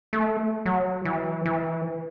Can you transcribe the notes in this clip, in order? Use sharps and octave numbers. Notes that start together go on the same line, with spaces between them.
A3
F#3
E3
E3